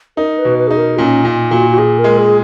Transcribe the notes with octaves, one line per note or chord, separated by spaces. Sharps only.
D#4 A#4
B4
B2
B4
D#4 G#4
A#4
A#2 C#4
A#2
A#2 F#4
F#4
A#2 G#4
A#4
G#3
G#4